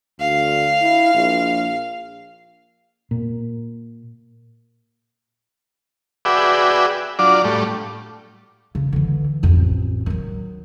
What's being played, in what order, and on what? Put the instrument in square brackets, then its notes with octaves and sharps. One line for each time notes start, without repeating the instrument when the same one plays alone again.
[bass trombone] D2 [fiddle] F5
[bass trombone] E4
A#1
[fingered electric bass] A#2
[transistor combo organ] F#4 G#4 B4 D5 E5 G5
F#3 D4 F4 D5
A2 G3 A3
[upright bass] C#3
D3 E3
A1 F2
D#3 F#3